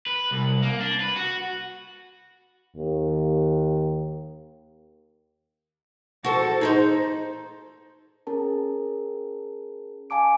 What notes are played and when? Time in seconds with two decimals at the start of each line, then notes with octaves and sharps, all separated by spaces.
0.07 B4
0.31 C2
0.63 A#3
0.80 D4
1.01 B4
1.16 F#4
2.77 D#2
6.24 F#4 A4 C5
6.61 D#4 G#4 B4 C5
8.27 C#4 G#4 A#4 A5
10.10 F5 G#5 A5 D6 D7